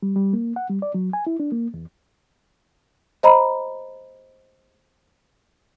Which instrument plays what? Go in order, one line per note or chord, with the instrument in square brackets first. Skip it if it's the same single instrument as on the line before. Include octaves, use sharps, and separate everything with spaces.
[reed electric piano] G3
G3
A#3
F#5
G3
D5
F#3
G#5
E4
D4
A#3
E2
[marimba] C5 D#5 A#5 B5